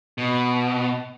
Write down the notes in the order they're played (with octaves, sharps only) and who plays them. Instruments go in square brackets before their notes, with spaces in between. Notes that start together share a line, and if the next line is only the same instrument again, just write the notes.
[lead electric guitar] B2